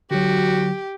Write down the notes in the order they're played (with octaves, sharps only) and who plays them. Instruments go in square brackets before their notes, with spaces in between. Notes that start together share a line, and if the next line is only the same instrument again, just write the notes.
[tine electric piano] D3 F#3 [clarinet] F#4 [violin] G4